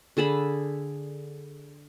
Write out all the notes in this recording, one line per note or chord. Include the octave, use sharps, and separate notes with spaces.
D3 G#4 A5 B5